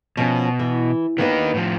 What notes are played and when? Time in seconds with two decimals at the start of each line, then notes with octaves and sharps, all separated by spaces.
0.17 B2 F3 C#4
0.59 E3
1.18 D#3 A#3 B3 D4 D#4 B4
1.54 A2 F3